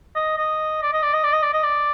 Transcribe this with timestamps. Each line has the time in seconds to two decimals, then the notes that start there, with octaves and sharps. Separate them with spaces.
0.15 D#5
0.38 D#5
0.83 D5
0.93 D#5
1.03 D5
1.14 D#5
1.24 D5
1.33 D#5
1.43 D5
1.53 D#5
1.63 D5